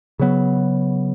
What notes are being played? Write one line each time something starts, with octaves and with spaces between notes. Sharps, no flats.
C#3 F#3 B3